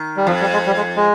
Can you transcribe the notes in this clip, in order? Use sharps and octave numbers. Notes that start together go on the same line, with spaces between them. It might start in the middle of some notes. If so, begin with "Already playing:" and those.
Already playing: D#3
G3
F2 F3
G3
G#3
G3
G#3
G#3